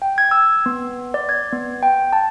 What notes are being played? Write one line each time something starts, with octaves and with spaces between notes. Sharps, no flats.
G5
G#6
E6
B3
D5
G#6
B3
G5
A5